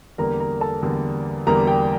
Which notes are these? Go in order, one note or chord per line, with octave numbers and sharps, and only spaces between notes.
E2 D3 G3 A#3 A#4 A#5
A#4 A#5
A4 A5
E2 D3 G3 A#3
E2 D3 G3 A#3 A#4 A#5
G4 G5